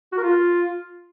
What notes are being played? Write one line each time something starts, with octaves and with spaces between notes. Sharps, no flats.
F#4
A#4
F4